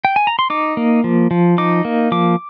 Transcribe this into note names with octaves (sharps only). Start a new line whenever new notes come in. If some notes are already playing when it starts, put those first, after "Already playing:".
G5
G#5
A#5
C6
D#4 D6
A#3
F3
F3
D#4 D6
A#3
F3 D6